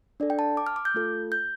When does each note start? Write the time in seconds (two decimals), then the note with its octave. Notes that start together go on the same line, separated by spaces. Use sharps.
0.20 D4 A4 D5
0.30 G5
0.39 A5
0.57 D6
0.67 F6
0.76 D6
0.85 G6
0.94 A3 F4 A4
1.32 G6